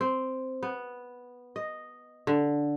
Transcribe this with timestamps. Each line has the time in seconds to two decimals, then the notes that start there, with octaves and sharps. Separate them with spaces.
0.01 C4
0.63 B3
1.56 D#5
2.27 D3